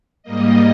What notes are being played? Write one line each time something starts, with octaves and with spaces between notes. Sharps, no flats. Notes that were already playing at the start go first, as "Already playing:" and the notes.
G#2 G3 A#3 D#5